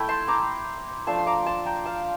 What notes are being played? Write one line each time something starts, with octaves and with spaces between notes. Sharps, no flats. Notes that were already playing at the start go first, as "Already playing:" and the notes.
Already playing: A3 E4 G5
A5 C6
A#5 D6
F3 A3 D4 F4 A5 C6
C6
A#5 D6
A5 C6
G5 A#5
F5 A5